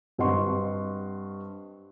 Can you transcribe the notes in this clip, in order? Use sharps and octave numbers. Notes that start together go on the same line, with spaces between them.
G2 C4 D#5 F#5 C6 C#6